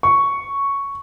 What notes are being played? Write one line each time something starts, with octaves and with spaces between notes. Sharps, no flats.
C#6